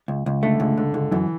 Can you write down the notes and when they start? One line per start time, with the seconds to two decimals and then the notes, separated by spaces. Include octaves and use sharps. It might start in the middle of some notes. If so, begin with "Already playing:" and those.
0.08 C#2
0.26 C#2
0.43 D3 A3
0.60 C#2 D3
0.77 C#2 D3
0.94 C#2 D3
1.11 F#2 E3